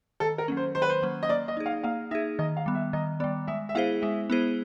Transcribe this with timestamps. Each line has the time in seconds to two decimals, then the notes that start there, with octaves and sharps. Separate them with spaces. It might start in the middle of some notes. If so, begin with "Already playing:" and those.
0.20 D#3 A4
0.38 A#4
0.48 F#3 A#3 C#4
0.57 C5
0.75 D#3 C5
0.82 B4
0.90 C5
1.03 F#3 A#3 C#4
1.23 D#5
1.29 A#3 D5
1.48 D#5
1.57 D#4 G#4
1.66 F5
1.84 A#3 F5
2.11 D#4 G#4 E5
2.39 D#3 D#5
2.57 F5
2.66 G3 B3
2.75 E5
2.93 D#3 D#5
3.20 G3 B3 D5
3.47 G#3 E5
3.69 E5
3.75 B3 E4 G#4 C5 F5
4.02 G#3 E5
4.30 B3 E4 G#4 C5